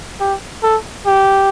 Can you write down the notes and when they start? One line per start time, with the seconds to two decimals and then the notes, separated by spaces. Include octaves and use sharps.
0.20 G4
0.63 A4
1.07 G4